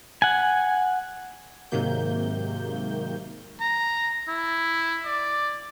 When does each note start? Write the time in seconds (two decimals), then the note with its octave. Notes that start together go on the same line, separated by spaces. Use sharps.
0.22 F#5 G#5
1.71 G#2 C3 D#3 F#3 A#3 G6
3.61 A#5
4.28 E4
5.05 D5